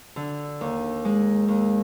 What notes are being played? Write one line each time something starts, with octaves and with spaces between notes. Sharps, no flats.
D3
D#2
G#3
D#2